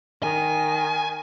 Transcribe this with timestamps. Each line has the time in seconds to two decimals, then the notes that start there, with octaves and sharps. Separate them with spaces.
0.23 D#3 G#5